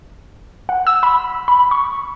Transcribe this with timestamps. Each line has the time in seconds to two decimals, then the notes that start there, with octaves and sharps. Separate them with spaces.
0.69 F#5
0.87 E6
1.03 B5
1.48 B5
1.71 C#6